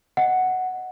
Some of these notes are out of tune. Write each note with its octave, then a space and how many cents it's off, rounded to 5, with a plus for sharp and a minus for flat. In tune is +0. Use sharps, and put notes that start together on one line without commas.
D#5 +0 F#5 +0